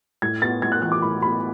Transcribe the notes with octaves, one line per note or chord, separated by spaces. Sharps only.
A2 G#6
B3 A6
A2 G#6
F#6
E3 F#6
D6
A2 B5
B3 B5